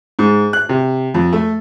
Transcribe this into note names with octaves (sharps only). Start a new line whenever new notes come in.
G#2
F#6
C3
F2
A3